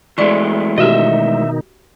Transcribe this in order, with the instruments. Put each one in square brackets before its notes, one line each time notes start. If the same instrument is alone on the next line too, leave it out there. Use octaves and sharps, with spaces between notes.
[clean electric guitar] E3 G#3 A3 [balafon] D5 C#6
[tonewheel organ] B2 D#3 D#4 [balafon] F#4 G4 [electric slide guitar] D#5 E5